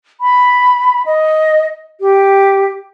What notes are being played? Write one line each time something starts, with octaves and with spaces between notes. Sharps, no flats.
B5
D#5
G4